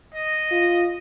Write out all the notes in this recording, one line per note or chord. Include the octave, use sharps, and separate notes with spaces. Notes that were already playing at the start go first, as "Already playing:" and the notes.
D#5
F4